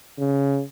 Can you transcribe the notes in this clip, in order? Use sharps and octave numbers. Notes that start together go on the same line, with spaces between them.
C#3